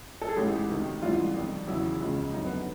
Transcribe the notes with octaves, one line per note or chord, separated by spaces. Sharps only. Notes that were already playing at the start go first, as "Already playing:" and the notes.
A4
G#4
A1 G#2 E3 G#3 G4
D2 C3 D#3
A1 G#2 E3 G3 F4
F2 C3 D#3 G3
E2 C#3 F#3 E4
C#2 C#3 F3 G#3
G1 F#2 D3 D#4
B3